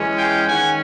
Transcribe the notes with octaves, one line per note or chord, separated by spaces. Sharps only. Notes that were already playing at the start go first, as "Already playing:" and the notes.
Already playing: E3 G#3 C#4
F5 G5
D#3 G#3 C#4 F#5 G#5